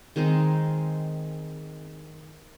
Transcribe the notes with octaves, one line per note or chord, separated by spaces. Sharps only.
D#3 G#3 C4 D#4